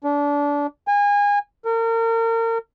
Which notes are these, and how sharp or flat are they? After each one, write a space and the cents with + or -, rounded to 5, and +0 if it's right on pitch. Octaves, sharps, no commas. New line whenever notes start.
D4 -25
G#5 -30
A#4 -35